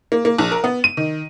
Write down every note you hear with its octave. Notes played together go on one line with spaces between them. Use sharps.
A#3
A#3
A#1
A#4
B3
D#7
D#3